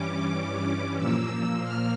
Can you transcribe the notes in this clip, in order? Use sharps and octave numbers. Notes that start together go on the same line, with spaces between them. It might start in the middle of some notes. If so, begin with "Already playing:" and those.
Already playing: G2 E3 G3 C#4 D6
A#2 F3 A#3 E6
F6